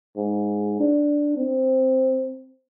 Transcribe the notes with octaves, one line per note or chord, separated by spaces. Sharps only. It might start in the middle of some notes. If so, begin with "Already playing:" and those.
G#2
D4
C4